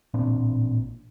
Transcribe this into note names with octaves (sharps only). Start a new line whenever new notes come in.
A1 A#2 C4 D4